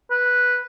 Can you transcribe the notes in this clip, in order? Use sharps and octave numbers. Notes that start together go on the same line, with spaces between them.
B4